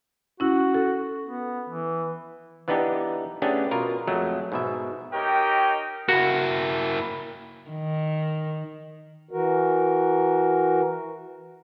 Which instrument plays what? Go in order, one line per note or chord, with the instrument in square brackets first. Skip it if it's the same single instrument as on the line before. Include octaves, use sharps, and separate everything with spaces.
[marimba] C#4 E4 [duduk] F#4
[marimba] A4
[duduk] B3
E3
[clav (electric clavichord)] E3 B3 D4 D#4 G4
A3 B3 C#4 D4 G4 G#4
B2 F4 A#4
F2 F#3 G#3 A3
G#2 B2 E5
[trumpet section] D#4 G4 A#4 C#5 D#5 G5
[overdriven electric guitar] A#3 E4 [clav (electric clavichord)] F#4
[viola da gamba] D#3
[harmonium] E3 F#4 A#4